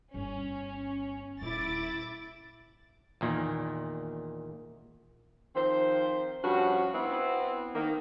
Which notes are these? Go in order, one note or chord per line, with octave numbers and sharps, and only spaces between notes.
G1 C#4
D#1 E4 D6 A6
E2 A#2 D#3
D#3 F3 C4 C5
G2 F3 C#4 F#4
B3 C4 E4
D#3 A#3